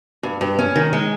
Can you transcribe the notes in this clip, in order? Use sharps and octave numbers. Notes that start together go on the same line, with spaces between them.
G2
G2
C#4
D#3
G#3